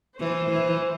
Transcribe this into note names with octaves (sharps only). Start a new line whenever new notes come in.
E3 C5
E3